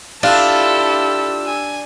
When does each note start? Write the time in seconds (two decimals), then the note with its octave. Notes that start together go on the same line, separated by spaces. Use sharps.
0.23 D4 E4 F4 G4 A4 E6
1.46 G#5